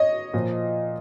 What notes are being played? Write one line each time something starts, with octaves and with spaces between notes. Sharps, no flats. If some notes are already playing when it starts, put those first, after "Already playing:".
Already playing: C#5 D#5
A#2 F3